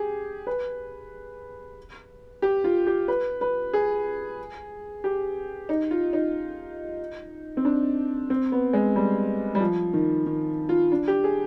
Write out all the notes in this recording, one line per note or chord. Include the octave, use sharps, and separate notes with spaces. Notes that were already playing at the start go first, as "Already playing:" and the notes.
Already playing: G4 G#4
B4
G4
F4
G4
B4
B4
G#4
G4
D#4
F4
D#4
C4
D4
C4
B3
G#3
G3
G3
F3
D#3
D#3
F4
D4
G4
G#4